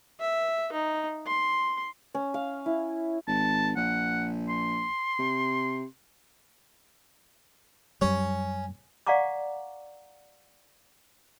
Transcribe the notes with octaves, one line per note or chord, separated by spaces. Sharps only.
E5
D#4
C6
C#4
F5
E4
G#1 A5
A#1 F#5
C6
C3
F#2 G3 C#4
D5 F5 F#5 A#5 C#6 D6